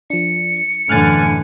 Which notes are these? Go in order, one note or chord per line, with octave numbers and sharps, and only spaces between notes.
F3 D4 C#7
F#2 A2 D3 E3 G#5 F6 F#6 A6